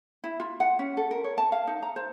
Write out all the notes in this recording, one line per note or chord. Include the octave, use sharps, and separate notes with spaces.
E4
F4
F#5
C#4
A4
A#4
C#5
A5
F5
D#4
A#5
C5